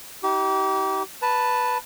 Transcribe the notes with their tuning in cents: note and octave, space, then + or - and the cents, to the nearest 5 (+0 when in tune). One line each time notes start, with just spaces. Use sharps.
D#4 +30 G4 -30
B4 +0 A5 +0